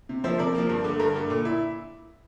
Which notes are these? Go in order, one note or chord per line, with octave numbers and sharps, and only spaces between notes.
C3
F3 A#3 C5 E5
C3 A#4 D5
F3 A#3
G2
D3 A3
G2 A#4
D3 A3
A#2
E4